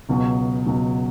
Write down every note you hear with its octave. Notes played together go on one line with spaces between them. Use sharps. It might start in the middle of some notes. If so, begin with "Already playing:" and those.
C#2 B2 F#3
C#2 B2 F#3